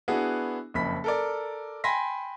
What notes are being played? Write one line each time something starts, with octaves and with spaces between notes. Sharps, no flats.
B3 D4 E4 F#4 G#4
F#1 F2 B5 B6
A4 A#4 D5
G5 G#5 B5 C6 A#6 B6